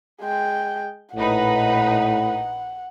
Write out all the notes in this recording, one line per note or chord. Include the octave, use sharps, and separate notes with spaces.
G#3 G5
A#1 A2 D#4 B4 F#5